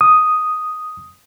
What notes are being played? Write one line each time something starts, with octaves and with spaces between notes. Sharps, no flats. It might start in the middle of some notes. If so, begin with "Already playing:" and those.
D#6